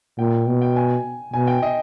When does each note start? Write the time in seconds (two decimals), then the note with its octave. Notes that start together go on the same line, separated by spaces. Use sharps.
0.19 A#2 G5
0.47 B2
0.62 G5
0.76 G#5
1.33 B2 G#5
1.47 G5
1.62 D#5